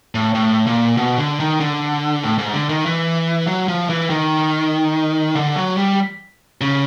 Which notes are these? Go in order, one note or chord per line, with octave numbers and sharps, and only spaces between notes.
A2
A2
A#2
B2
D3
D#3
D3
A2
G#2
D3
D#3
E3
F#3
F3
E3
D#3
D3
F#3
G3
C#3